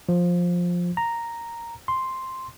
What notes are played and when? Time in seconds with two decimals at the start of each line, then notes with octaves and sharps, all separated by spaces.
0.09 F3
0.97 A#5
1.88 C6